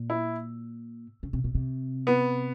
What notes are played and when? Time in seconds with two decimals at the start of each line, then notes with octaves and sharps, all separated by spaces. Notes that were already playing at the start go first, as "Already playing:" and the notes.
Already playing: A#2
0.10 E4
1.23 C#3
1.33 C3
1.44 B2
1.55 C3
2.07 B3